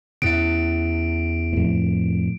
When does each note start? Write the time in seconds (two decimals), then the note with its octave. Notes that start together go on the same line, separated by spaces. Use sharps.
0.22 E2 C#4 E4 E5 D7
1.53 F2 A2